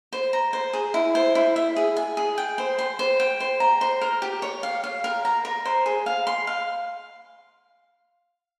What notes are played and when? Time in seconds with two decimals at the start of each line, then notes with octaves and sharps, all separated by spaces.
0.13 C5
0.33 A#5
0.53 C5
0.73 G#4
0.94 E4
1.15 C5
1.35 E4
1.56 E5
1.76 G#4
1.97 G#5
2.17 G#4
2.38 G5
2.58 C5
2.79 C6
2.99 C5
3.20 G5
3.40 C5
3.60 A#5
3.81 C5
4.01 A#4
4.22 G4
4.42 C#5
4.63 F5
4.84 F5
5.04 A#4
5.25 A#5
5.45 A#4
5.65 C5
5.86 G#4
6.06 F5
6.27 C6
6.47 F5